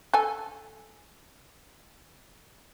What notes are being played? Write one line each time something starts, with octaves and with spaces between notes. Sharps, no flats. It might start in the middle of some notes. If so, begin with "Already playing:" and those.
A4 G#5